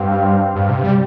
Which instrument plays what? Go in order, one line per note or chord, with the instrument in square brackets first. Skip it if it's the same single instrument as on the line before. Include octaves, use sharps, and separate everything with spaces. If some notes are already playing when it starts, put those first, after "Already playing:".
Already playing: [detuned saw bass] G2 [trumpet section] C4 G4 F5
[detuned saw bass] G2
C3
G3